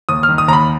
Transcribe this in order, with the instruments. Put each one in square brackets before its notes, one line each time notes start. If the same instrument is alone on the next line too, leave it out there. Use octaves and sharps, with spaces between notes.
[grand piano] D#2 D#6
F6
D#3
D#6
D#2 A#5
B5